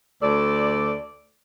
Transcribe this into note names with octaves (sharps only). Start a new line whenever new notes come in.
D2 A4 D5